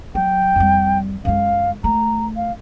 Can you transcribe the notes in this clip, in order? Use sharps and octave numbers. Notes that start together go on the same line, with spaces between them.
F#3 G5
F2 G3
F#2 G#3 F5
A3 A#5
F5